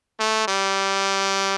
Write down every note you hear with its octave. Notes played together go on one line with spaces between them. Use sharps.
A3
G3